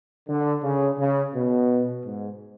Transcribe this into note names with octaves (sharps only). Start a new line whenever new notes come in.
D3
C#3
C#3
B2
G#2